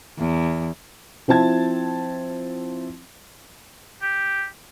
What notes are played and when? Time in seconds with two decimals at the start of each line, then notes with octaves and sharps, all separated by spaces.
0.18 E2
1.28 F3 C4 E4 A5 G#6
4.02 G4